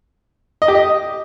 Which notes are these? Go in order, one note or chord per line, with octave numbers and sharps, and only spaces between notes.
D#5
G4
D#5